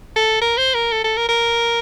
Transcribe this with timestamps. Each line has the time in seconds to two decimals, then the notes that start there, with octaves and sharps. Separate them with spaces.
0.16 A4
0.41 A#4
0.58 C5
0.74 A#4
0.92 A4
1.04 A4
1.17 A#4
1.29 A#4